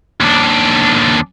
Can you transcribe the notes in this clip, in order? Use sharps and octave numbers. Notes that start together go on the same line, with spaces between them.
D#2 D4